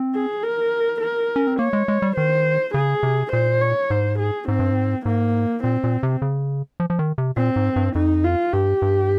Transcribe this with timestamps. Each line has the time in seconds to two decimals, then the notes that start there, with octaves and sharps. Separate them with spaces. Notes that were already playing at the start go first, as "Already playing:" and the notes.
Already playing: C4
0.15 G#4
0.43 A#4
1.01 A#4
1.36 C#4
1.47 C4
1.59 A#3 C#5
1.73 G#3
1.88 G#3
2.02 G3
2.17 D#3 C5
2.74 C#3 G#4
3.03 C3
3.32 A#2 C5
3.61 C#5
3.90 G#2 C5
4.19 G#4
4.48 G#2 C4
4.59 G2
4.71 G#2
5.06 G#2 A#3
5.64 A#2 C4
5.84 A#2
6.03 C3
6.22 C#3
6.80 F3
6.90 F3
6.99 D#3
7.18 C3
7.37 A#2 C4
7.56 G#2
7.76 G2
7.95 F2 D#4
8.24 F4
8.53 G2 G4
8.82 G2